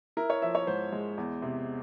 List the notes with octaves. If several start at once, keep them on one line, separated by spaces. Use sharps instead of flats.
E4 A#4
C#5
F3 E5
C#5
G#2 C5
G#3
E2
C3